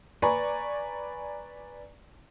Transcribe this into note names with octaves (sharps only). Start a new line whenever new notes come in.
B4 D5 G#5 A#5 B5 C#6